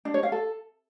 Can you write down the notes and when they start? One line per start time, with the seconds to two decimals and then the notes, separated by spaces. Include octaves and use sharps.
0.05 D4
0.14 C#5
0.23 F5
0.32 A4